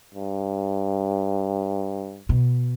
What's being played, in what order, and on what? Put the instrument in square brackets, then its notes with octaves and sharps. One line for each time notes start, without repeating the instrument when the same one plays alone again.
[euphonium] G2
[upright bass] B2